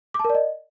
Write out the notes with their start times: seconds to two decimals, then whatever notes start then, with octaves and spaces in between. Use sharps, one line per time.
0.14 D6
0.19 A5
0.25 A#4
0.30 D5
0.35 D#5